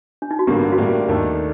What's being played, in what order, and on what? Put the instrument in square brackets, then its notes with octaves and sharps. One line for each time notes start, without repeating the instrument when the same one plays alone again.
[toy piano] D4
D#4
F#4
[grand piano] A1 G2 D3 F#3 A#3 [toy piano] G4
[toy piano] F#4
[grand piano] A2 G3 A#3 D4 [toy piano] G4
[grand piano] D#2 D#3 A3 D4 A4